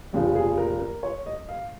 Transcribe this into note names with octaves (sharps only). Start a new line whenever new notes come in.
F1 D#2 C#3 F3
G#4
A#4
A#4
C#5
D#5
F5